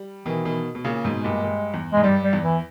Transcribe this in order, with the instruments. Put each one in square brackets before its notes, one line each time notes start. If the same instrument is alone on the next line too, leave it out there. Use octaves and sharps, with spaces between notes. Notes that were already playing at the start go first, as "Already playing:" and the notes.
Already playing: [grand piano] G3
[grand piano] B2 D#3 [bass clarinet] E3
[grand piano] B2 D#3
B2
A#2 C#3
G#2 B2
[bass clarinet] G#3
[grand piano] G2 A#2
G2
E2
[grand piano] G#2 [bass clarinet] G#3
[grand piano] G2 [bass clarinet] G3
[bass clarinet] G3
[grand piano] E2
[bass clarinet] E3